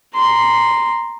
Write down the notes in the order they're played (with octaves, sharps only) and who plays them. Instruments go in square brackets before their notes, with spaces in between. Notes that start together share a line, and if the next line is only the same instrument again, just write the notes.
[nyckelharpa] A#5 C6